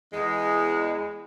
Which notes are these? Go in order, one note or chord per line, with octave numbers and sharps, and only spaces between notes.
E2 G#3